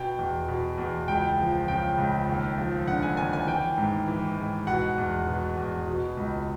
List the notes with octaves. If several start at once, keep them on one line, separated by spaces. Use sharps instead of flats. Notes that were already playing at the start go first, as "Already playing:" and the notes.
Already playing: B2 G5
E2
B2
E2
C#2 G5
F3
C#3 G5
C#2
D#2
F3
D3 F#5
G#5
D#2 G#5
G#5
E3 G5
G#2
E3
G#2
B2 F#5
E2
B2
E2
B2
C#2